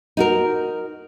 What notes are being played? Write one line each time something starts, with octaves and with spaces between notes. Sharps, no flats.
D#4 F#4 A#4